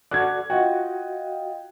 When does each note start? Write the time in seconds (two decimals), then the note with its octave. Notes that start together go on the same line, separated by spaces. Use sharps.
0.11 F#4 A4 D5 F#6 G#6
0.50 F4 F#4 D#5 G5